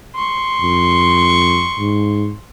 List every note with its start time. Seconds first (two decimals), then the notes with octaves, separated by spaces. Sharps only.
0.15 C6 C#6
0.61 F2
1.78 G#2